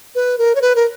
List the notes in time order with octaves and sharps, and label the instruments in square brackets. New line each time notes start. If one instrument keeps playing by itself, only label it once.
[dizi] B4
A#4
C#5
B4
A#4